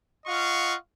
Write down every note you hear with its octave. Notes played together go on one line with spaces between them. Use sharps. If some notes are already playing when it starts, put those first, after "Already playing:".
F4 D#5 F5 F#5 C#6